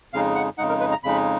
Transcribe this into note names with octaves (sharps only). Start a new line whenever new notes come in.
F2 C#3 G#3 D#4 F5
F#5
F2 C#3 G#3 D#4 F#5
A#4
B4
A#5
F2 C#3 G#3 D#4 B5